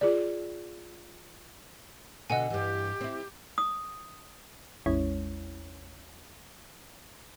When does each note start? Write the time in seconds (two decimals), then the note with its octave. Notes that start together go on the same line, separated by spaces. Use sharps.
0.01 F4 G#4 D5
2.30 B2 D3 D#5 F#5 G#5
2.50 G2 E3 G4
3.01 C4 E4
3.58 D#6
4.86 A1 E2 G#3 C#4 E4 C#5